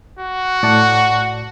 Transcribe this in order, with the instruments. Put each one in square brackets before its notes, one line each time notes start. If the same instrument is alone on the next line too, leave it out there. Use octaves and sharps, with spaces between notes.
[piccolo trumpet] F#4
[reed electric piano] A2 D5 A5 [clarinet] F#5